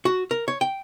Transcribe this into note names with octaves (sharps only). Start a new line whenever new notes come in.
F#4
A#4
C#5
G5